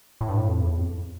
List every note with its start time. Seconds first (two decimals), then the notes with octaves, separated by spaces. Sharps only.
0.21 A2
0.28 G2
0.37 A2
0.48 F2
0.62 E2
0.77 F2